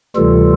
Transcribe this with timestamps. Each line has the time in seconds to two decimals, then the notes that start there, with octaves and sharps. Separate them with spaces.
0.16 D2 C3 E3 G3 F4 A4